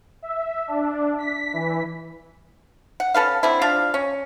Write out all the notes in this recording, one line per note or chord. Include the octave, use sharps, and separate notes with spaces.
E5
D4
B6
E3
F#5
C#4 A4 B4 F5
D3 C4 E4
F3 D4 F5
C#4